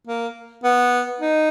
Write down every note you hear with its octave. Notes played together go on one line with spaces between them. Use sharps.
A#3
B3
D#4